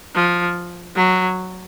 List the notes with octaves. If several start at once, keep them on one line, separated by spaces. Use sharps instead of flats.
F3
F#3